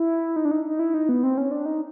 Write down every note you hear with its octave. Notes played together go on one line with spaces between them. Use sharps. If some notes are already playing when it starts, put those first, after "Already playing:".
Already playing: E4
D#4
D4
D#4
D#4
E4
D#4
B3
C4
C#4
D4
D#4